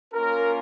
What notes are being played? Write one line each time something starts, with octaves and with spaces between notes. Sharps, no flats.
A#3 C#4 F4 A#4